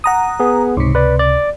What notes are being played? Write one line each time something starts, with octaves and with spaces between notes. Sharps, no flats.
F#5 A#5 D#6
B3 G#4
C#2 G#2 C3
B4 D5
D5